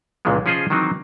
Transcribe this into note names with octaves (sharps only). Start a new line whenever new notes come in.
C#2 A#2 C#3 E3 F3 G#3
F3 C#4 F4 G#4 C5 D#5
D#3 E3 F#3 C4 D#4